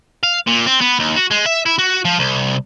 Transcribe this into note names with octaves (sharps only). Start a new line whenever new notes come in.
F5
A#2
C4
B3
D#2
F#4
G#3
E5
E4
F#4
F3
C2